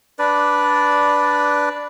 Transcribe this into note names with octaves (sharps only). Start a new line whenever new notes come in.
D4 B4 D5